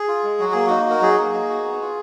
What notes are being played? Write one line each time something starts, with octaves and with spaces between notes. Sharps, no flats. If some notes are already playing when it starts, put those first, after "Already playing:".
Already playing: G#4
F4
G#3
F#3 F#4
A#3 G#4
D#4 F#4
F#4 A#4
F#3 G#4
A#3
D#4
F#4
B3
F4